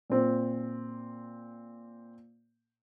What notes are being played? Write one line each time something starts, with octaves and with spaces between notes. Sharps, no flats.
A#2 C4